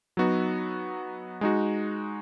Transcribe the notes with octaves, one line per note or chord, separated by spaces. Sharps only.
F#3 B3 D#4 F#4
G#3 D#4 F#4